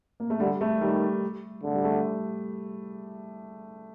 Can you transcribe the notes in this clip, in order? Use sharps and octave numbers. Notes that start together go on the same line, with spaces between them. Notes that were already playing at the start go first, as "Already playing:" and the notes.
A#3
A3
D3 G3
A3
D#3 G3
D3 A3
G3
A3